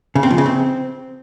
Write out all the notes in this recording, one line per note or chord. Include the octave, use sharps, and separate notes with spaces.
C#3
C4
F3
C#3
C4